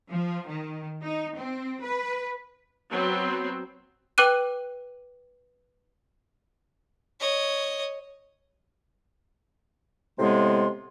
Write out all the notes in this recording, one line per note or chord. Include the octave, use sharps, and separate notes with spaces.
F3
D#3
D#4
C4
B4
F#3 B3 C4
B4 G5 D6 F#6 D#7
C#5 D#5
A2 C3 G#3 B3 C6